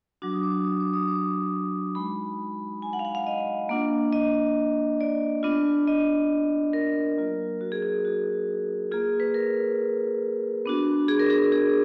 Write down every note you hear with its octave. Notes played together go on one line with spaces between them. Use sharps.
F#3 D4 F#4 D6
D#6
D6
D#6
D6
D#6
D6
G#3 D#4 F#4 B5
G#5
F#5
F5
F#5
F5
D#5
A#3 D4 F4
D#5
D5
B3 D4 F4
D#5
A#4
F#3 A#3 F4
F#4
G#4
G#4
F#4
A#3 F4 G#4
B4
A#4
B3 D4 F#4
G#4
A#4
G#4
G#4